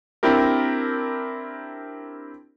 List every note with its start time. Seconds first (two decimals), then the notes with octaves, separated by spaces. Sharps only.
0.23 C4 D4 E4 G4 A#4